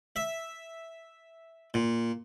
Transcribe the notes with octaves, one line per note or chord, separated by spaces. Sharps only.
E5
A#2